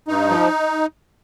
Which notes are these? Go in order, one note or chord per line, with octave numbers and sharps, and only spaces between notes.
G2 D#4
F3